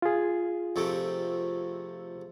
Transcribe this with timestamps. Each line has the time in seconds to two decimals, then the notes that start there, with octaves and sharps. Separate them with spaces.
0.02 F4 G#4
0.76 F2 C3 A3